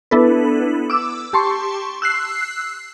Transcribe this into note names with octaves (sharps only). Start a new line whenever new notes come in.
B3 D4 E4 A4 B4
D6 E6
G4 A5 C6 C#6
E6 F#6 C7